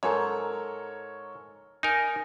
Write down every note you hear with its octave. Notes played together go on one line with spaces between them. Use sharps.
G#2 A4 A#4 C#5
D#4 A#4 G#5